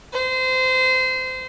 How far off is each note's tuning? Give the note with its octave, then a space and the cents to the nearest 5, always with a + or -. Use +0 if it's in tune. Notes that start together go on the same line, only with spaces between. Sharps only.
C5 -25